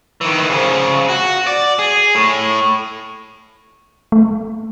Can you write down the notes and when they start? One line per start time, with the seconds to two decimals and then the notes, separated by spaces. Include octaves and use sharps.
0.21 D#3 E3
0.49 C#3 F3
1.09 F#4
1.47 D5
1.79 G#4
2.15 A2
4.12 A3